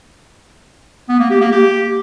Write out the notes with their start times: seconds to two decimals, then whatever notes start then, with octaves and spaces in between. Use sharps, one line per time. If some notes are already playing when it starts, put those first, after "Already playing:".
1.09 B3
1.20 A#3
1.31 G4
1.41 A#3
1.52 G4